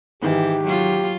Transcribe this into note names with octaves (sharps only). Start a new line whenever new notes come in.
G#2 D#3 E3 G4
F#3 F4